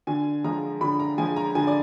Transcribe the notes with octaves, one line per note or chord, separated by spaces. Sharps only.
D3 G#5
F3 G#3 A#5
D3 B5
A#5
F3 G#3 G#5
A#5
D3 G#5
D5